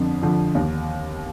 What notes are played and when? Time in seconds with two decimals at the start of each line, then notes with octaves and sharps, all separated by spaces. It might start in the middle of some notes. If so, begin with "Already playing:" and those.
Already playing: F2 D3 F3
0.22 D3 F3
0.55 D#2